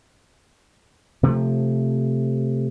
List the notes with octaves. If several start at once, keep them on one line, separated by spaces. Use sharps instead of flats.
C3 F3 A3